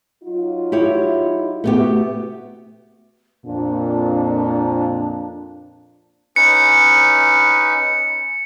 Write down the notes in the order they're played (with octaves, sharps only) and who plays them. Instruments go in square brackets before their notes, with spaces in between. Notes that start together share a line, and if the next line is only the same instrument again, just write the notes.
[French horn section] F#3 D#4 F4
[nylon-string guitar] E4 G4 C#5
[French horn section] C3 F#4 [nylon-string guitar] A3 B3 G4
[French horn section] F2 A#2 [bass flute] D4
[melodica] C#4 D#4 B4 [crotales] C#7